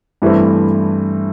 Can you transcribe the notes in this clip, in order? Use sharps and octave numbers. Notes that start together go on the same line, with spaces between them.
G2 E3 A3 C4